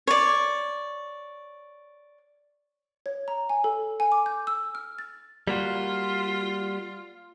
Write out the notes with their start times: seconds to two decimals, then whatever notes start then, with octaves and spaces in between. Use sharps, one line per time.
0.07 C#5 D5
3.06 C#5
3.28 A#5
3.49 G#5
3.64 A4
4.00 G#5
4.12 D6
4.26 G6
4.47 E6
4.75 F6
4.99 A6
5.48 G3 A#3 F4 F#4